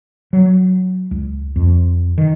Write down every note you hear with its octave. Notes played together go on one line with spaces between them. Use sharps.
F#3
C#2
F2
D#3